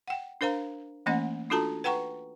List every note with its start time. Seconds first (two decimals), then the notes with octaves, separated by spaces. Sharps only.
0.08 F#5 G5
0.41 D4 A#4 C5 F5 A#5
1.06 E3 A3 A#3 C#4 D#5 F#5
1.50 D4 F4 F#4 A4 A5 A#5
1.84 B4 F#5 G5 A#5 C#6